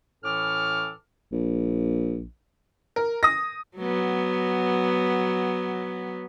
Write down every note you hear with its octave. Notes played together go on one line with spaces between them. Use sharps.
A2 E3 C#4 A4 D6 F6
A#1
A#4
D#6 A#6
F#3 B3